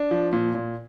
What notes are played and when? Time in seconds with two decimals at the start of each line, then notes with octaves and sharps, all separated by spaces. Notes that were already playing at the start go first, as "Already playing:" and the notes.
Already playing: D4
0.11 F3
0.33 A#2
0.55 A#2